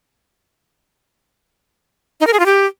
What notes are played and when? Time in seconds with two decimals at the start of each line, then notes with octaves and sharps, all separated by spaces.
2.21 D#4
2.27 A#4
2.33 G#4
2.39 F4
2.46 G4